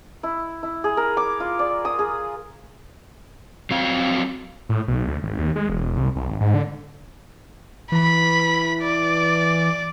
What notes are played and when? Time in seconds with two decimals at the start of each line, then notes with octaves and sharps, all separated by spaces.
0.23 E4
0.63 E4
0.84 G#4
0.97 A#4
1.17 D6
1.40 F4
1.59 D5
1.85 D#6
1.99 G#4
3.71 F#3 C4 F5
4.69 A2
4.88 B1
5.07 D2
5.23 G#1
5.38 D#2
5.56 G#3
5.69 E1
5.97 C2
6.16 C2
6.29 G#1
6.41 G#2
6.54 D3
7.92 E3 B5
8.83 D5